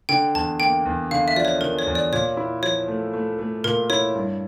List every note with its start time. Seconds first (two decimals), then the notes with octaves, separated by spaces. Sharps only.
0.09 D3 G5
0.35 E2 A5
0.60 A#3 G5
0.85 E2
1.11 D3 F5
1.28 E5
1.36 F3 D5
1.45 C#5
1.61 D3 A#4
1.79 C#5
1.86 E2
1.95 D5
2.12 A#2 C#5
2.37 E4
2.62 F3 C#5
2.88 A3
3.14 A3
3.39 A3
3.64 A#2 A#4
3.90 E4 C#5
4.15 G2